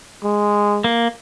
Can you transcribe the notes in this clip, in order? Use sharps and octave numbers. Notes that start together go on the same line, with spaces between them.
G#3
A#3